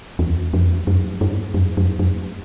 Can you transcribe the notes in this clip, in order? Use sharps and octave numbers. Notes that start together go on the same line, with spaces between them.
E2
F2
F#2
G2
F#2
F#2
F#2